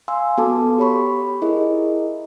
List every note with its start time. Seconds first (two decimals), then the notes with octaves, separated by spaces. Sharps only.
0.08 F5 G#5 C6 E6
0.38 B3 F#4 A4 A5 D6
0.78 G4 C#5 B5 C#6
1.42 E4 G#4 A#4 D#5